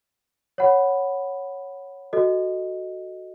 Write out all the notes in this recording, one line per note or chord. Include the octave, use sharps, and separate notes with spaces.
C#5 F#5 B5
F#4 A4 D#5